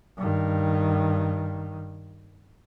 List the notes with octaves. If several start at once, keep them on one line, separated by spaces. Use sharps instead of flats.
G2 D#3